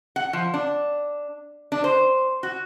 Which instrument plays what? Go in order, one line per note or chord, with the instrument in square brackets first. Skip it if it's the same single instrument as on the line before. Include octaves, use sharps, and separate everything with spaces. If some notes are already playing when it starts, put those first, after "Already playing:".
[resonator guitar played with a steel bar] F#5
F3
D4
D4
C5
F#4